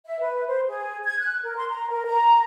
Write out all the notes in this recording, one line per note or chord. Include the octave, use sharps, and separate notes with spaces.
E5
B4
C5
G#4
G#6
F#6
A#4
C6
A#5
A#4
A#5